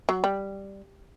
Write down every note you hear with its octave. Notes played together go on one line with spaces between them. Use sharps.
F#3
G3